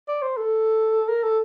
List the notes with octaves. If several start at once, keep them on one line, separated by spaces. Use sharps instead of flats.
D5
C5
A4
A#4
A4